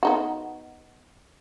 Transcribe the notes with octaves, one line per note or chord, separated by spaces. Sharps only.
B3 D#4 F#4